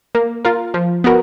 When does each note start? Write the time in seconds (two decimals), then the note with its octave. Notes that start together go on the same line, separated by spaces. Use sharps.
0.15 A#3
0.45 F4 A#4 F5
0.74 F3
1.04 B3 F#4 A#4